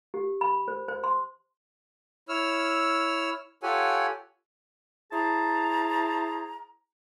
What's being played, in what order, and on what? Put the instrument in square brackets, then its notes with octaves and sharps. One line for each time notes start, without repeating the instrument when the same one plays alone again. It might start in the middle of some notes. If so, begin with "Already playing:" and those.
[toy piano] G4
B5
C5
C5
C6
[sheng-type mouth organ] E4 C#5 E6 F6
F4 G4 A4 C#5 F#5 G#5
[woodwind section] E4 G#4 C5 A5 A#5